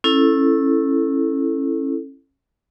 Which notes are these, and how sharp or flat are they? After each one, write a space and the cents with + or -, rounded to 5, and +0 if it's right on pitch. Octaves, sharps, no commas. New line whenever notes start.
C#4 -25 E4 +0 A4 +0